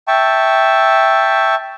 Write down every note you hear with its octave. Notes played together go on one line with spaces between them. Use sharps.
E5 G5 A5 C#6